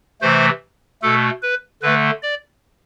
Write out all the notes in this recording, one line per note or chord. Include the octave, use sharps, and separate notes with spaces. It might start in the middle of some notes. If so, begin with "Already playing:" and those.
C3 E3 A3 C5
B2 A3 A4
B4
D3 A3 B4
D5